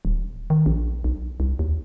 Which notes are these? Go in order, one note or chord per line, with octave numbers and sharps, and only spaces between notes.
D#1
D#3
A#1
B1
C2
D#2